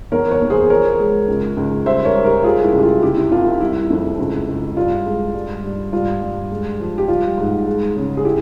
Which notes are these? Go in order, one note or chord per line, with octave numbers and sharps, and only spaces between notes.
E2 A#4 C#5
A#4 C#5
E2
G#4 C5
F3 A#4 C#5
G#3
C#2
C#2
G3 C5 E5
A#4 C#5
G3
G4 A#4
G3 F4 G#4
E4
C#2
G4
F4
C3 E4 G4
E4
C2 F4
E4
G3 E4
F2
C#2
C#2
G2 F4
G#3
G2
G2
G2 F4
G2
G#3
F3
G4
G3 F4
G#2
G#3
C#3
G#4
E4 G4